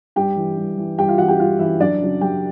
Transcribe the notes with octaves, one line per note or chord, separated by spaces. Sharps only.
G2 G4 G5
E3
G2
E3
G2 G4 G5
F4 F5
E3 F#4 F#5
G4 G5
G2 F4 F5
E3 E4 E5
F#2 D4 D5
C#3 F#3
F#2 G4 G5